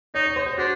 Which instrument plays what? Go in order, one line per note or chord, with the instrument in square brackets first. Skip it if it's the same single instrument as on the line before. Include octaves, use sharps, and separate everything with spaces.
[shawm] D#4 [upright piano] C#5
[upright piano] C#5
C5
C5
[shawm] D4 [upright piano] F#4